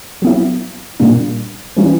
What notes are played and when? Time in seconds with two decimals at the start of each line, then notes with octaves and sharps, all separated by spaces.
0.22 F#3 B3 E4
1.00 A#2 G3 A#3 D4
1.76 E3 G3 C#4 E4